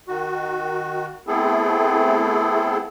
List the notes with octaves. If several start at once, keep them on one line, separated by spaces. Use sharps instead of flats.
D#3 F#4
A3 B3 C4 E4 G#4 A4